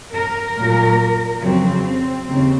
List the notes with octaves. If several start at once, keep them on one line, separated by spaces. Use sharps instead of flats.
A#4
A#2 F#3
F2 C#3 F#3 C4
C4
D#2 C#3 C4